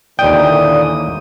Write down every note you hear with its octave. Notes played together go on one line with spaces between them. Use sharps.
D#2 A#2 D3 E3 D5 G5 D#6